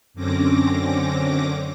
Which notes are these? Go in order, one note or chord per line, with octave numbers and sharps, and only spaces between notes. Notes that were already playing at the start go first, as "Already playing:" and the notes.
F#2 D3 C4 C#4 D6 A#6